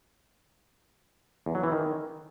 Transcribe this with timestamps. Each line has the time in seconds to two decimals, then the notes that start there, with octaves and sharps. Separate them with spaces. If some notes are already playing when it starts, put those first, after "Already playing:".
1.46 E2
1.55 F#3
1.63 E3
1.72 D#3